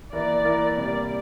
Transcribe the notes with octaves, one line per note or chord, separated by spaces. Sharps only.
E3 A#3 E4 A#4 D5
E3 A#3 E4 A#4
C3 G3 A#3 D5